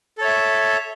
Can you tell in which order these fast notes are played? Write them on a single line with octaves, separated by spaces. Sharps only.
A4 C#5 E5